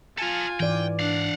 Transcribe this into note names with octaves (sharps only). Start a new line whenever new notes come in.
F4 A4 F5 G#5
G#2 E3 D5 G5
D4 F5 F#5